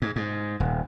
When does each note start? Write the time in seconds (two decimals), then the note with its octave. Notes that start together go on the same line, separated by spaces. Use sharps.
0.02 G#2
0.16 G#2
0.60 D#1